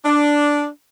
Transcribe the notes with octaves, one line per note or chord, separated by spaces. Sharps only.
D4